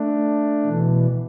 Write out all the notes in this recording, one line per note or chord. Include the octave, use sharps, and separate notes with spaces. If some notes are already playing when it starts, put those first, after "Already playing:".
Already playing: A3 D4
B2 E3